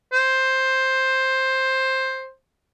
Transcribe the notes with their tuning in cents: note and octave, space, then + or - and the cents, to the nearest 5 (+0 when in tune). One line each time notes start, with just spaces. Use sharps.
C5 +10